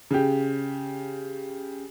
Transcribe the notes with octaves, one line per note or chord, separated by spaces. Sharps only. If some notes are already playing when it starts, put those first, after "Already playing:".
C#3 G4